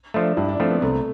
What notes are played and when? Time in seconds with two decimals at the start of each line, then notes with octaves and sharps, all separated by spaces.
0.14 F3 A3 D4
0.37 G2 E4
0.49 D4
0.60 F3 A3 C4
0.71 B3
0.82 C2 A3